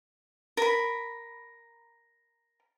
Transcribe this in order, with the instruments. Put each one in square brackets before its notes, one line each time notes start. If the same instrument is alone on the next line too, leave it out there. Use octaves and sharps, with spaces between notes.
[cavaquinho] A#4 B5